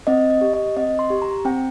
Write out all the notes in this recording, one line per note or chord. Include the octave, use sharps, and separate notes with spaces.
C4 D#5
D#5
G4
D#5
C4 D#5
C6
G4
A#5
C4 G5